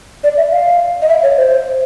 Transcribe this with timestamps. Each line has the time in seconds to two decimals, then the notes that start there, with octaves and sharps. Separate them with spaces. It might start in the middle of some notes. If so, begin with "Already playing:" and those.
0.24 D5
0.37 E5
0.52 F5
1.02 D#5
1.09 E5
1.23 C#5
1.37 C5